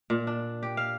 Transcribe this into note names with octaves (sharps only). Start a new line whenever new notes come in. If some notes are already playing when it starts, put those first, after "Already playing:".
A#2
D4
G4
F5